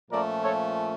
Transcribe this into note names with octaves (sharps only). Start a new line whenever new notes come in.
A#2 F3 A3 C#4 A#4 D5
A4 C#5